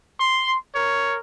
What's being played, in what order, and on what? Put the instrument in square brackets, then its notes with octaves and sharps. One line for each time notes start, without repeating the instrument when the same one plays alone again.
[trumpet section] C6
A#4 C#5